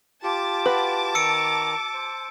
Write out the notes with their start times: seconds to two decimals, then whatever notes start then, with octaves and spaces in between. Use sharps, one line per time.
0.23 F4 G4 A5 D6
0.66 F#4 B4
1.15 D#3 A#5 E6 C#7 D7
1.94 C5